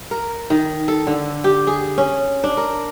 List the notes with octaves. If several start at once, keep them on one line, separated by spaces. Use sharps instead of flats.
A#4
D#3
A4
D3
G4
G#4
C#4
D4
A#4